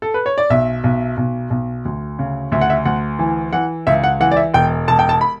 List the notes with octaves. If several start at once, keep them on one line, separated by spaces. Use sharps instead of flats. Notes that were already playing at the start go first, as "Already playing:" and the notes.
A4
B4
C#5
D5
B1 E5
B1
B1
B1
D2
C#3
D2 E5
F#5
E5
D2 F#5
E3
E3 F#5
C#2 E5
F#5
E3 F#5
D5
E5
E1 G5
E1 A5
G5
A5
B5